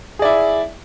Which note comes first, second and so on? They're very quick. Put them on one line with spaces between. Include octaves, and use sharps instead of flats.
G#4 D5 E4